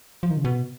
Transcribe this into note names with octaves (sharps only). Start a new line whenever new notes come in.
F3
D#3
C#3
B2